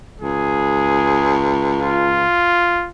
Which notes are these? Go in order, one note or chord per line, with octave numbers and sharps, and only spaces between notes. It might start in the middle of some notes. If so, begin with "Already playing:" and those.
C#2 G#4
F4